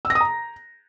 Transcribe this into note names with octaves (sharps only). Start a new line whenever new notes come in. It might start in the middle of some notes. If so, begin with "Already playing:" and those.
E6
A#6
D#6
A#5